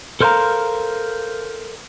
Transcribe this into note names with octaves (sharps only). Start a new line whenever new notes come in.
A4 A#4 C5 E5 F5 A#5